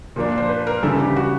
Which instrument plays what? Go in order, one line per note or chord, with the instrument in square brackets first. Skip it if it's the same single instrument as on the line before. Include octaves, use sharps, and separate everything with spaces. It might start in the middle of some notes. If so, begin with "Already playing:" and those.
[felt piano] A#2 F3 A#3 D4
C5
B4
A#4
C#3 E3 G3 A4
G4
F#4